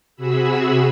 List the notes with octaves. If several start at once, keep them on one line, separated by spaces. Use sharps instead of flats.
C3 F#4 G#4 B5 E6